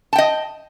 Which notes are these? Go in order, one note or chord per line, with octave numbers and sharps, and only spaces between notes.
D#5 G5 A5